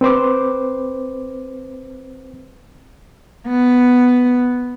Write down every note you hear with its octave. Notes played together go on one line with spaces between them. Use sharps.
C4 B4 C5 D6
B3